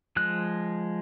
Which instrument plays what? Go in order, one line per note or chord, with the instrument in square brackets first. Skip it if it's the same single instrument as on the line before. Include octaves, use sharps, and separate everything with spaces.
[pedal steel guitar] F3 G#3 F#6